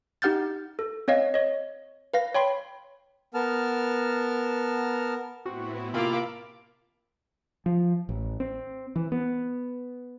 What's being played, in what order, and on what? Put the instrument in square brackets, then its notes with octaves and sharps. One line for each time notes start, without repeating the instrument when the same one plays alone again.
[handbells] D#4 G4 F#5 F6 G6 A6
A4
C4 C#5 D#5 F5
C#5 D#5
B4 F5 A#6
C#5 G5 B5 C6
[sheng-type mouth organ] B3 A#4 A5 F6
[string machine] A2 B3 E4 [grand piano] C4 [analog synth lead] F#4
[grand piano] C3 F4 E6 [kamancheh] A#3 D6 [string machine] A5 [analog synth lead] B5
[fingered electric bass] F3
A1
C4
E3
B3